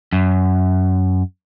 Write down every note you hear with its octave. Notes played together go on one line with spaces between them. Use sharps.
F#2